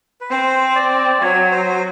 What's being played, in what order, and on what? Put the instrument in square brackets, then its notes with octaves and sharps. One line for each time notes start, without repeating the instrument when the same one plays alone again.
[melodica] B4
[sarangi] C4 [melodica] C5
[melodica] D5
[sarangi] F#3 [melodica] C#5
[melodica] C5